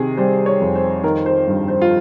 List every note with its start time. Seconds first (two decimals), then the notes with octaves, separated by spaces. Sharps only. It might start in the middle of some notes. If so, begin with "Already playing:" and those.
Already playing: C3 D#3 G#4
0.17 G3 C5
0.46 C#5
0.60 F2
0.75 C5
1.04 D#3 A#4
1.26 C5
1.48 G2
1.68 C5
1.82 F4